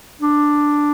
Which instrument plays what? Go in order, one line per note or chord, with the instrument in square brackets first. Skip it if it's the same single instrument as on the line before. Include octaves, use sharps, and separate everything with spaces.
[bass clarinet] D4